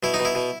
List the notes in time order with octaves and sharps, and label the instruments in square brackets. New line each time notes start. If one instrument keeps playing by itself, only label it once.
[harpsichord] B2 E4
D#4
B2
E4
B2